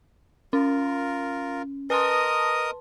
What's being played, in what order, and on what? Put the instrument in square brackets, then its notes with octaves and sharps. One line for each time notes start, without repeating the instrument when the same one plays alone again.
[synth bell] C#4 [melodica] F4 A#4
[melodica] A#4 D#5 D#6 [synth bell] B4 A5 C6